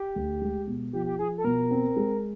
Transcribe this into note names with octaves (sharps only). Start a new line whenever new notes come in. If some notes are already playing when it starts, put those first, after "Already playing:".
Already playing: G4
D2
G#3
B2
F3 G4
G4
F3 G#4
A4
B2 A#4
C4
G#3